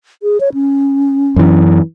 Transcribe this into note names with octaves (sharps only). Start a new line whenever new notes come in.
G#4
C#5
C#4
F#2 E3